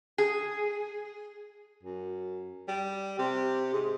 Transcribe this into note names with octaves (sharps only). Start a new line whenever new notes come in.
G#4
F#2
G3
C3
G#2